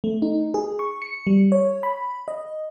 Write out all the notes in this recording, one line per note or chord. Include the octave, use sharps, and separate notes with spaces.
A3
D#4
G#4
C#6
C#7
G3
C#5
B5
D#5